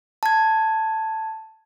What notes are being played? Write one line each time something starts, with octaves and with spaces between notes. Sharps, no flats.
A5 G#6